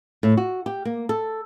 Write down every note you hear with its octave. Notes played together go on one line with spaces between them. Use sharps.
A2
F#4
G4
A#3
A4